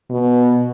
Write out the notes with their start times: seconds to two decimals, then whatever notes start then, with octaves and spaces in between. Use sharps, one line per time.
0.10 B2